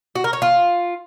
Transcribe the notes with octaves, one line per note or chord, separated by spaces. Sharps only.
F#4
A#4
C#5
F4